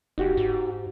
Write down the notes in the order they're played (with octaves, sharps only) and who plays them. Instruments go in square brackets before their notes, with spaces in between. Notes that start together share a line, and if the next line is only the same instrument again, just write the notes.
[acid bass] F#1 [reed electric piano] D#4 F#4 G4
[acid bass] G#2